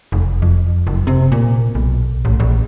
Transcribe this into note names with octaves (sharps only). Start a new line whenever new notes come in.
F1
F2
F#1
C3
A#2
B1
A1
A#1